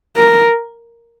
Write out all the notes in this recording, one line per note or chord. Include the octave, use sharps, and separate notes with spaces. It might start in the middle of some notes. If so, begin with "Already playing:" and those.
A#4